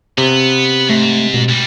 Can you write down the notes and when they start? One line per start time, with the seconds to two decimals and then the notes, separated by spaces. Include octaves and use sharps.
0.18 C3 B3
0.90 G#2 A3
1.34 B2
1.49 D2 G3